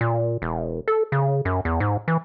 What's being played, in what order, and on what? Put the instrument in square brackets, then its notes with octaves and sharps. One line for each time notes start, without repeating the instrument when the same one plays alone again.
[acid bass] A#2
E1
A4
C#3
F#2
E2
G#2
E3